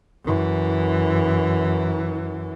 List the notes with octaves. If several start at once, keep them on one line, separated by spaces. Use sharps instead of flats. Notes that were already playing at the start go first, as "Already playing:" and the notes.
F#2 E3